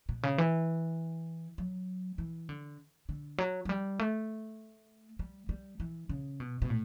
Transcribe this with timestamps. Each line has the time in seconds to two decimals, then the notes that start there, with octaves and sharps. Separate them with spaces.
0.09 B2
0.23 C#3
0.38 E3
1.58 F#3
2.18 E3
2.49 D3
3.09 D3
3.38 F#3
3.65 F#3
3.69 G3
3.99 A3
5.19 G3
5.49 G3
5.80 E3
6.09 C#3
6.40 B2
6.62 B2
6.70 A2